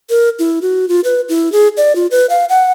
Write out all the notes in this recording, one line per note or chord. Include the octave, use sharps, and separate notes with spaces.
A#4
E4
F#4
F4
B4
E4
G#4
D5
F4
B4
F5
F#5